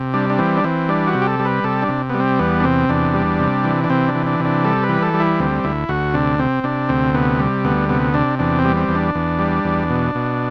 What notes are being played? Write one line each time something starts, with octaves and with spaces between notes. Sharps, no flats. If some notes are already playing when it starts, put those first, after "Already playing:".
Already playing: C3
G3 D4
D4
E3 C4
D4
E3 C4
G3 D4
F#4
C3
G4
A4
G3
B4
C3 A4
D4
C3
G3 B3
C4
E2 B3
D4
C3 C4
E2 D4
G3
C3
E3
D4
C3 C4
D4
E3
D4
C3
D4
G3 A4
B4
E3
A4
G3
E4
D2 C4
D2 E4
D2 F#4
C3 D4
C3 C4
C3 D4
D2 C4
C3 B3
G3
D2 B3
C3 B3
C3 D4
E2 D4
C4
G3
C4
E2
D4
E2
G3
E2
B2
B2